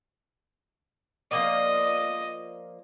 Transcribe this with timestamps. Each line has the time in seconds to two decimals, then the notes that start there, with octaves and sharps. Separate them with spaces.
1.31 F3 A#3 D5 D#5